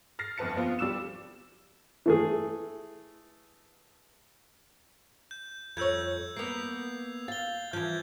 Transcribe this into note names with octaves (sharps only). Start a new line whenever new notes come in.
F6 A6 A#6 C7
G1 F2 B4 A5 C#7
F3 B3 C4 F4
D2 G3 D6 E6 E7
E3 A3 G#4
G6
F2 C#5 E6 G6 G#6
A#3 B3 C7 F7
F5 A6 G7
E3 F3 G6 G#6